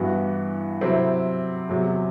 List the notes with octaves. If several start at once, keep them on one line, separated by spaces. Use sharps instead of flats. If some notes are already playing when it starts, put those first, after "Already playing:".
Already playing: G2 E3 B3 F#4
C3 F#3 C4 E4
E2 C3 F#3